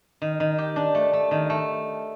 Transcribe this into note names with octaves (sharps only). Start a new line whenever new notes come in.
D#3
D#3
G4
D4
A3
A3
D#3
A3